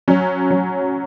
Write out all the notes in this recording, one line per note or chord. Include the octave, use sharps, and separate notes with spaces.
F#3 C#4
F#3